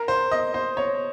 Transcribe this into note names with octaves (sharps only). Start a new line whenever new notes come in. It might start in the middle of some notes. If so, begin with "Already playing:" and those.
Already playing: A#4
C5
D#5
C5
C#5